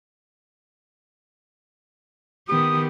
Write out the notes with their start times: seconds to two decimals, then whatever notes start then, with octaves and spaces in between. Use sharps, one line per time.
2.48 D#3 B3 G4 D#6